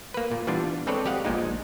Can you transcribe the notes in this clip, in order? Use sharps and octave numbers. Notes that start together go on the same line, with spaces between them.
A#3 B4
A#2
E3 G3 B3 D4 F4
G#3 C4 A4 B4 C#5 D5
G4 D#5 F5 F#5
A#1 A#2 G#3 D#4